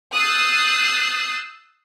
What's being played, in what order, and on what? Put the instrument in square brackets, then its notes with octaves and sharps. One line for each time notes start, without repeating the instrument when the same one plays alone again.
[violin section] D#6 E6 F#6 G6 A6 C7